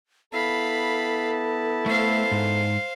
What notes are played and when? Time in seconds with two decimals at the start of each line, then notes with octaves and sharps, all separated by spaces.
0.33 B3 E4 A4 F5 A5 B5
1.86 A3 C5 F5
2.31 G#2